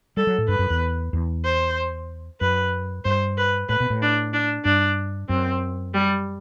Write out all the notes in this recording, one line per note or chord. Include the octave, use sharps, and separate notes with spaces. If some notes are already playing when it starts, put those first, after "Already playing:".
G3 A4
F#3
A2
G2 B4
F#2
E2
E2
C5
F#2 B4
G2 C5
B4
A2 B4
B2
A2
D4
D4
G2 D4
F#2 C4
G3